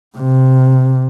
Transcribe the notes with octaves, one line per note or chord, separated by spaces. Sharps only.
C3